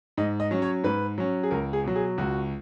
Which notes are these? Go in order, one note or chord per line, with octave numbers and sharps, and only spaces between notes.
G#2 D#5
D#5
F#3 C#4
C#5
G#2 B4
F#3 C#4
G#4
C#2 A#4
G#4
B2 F#3
G#4
C#2 F#4